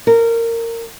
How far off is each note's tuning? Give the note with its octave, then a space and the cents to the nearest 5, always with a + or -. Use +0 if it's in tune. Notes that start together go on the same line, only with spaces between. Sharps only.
A#4 -20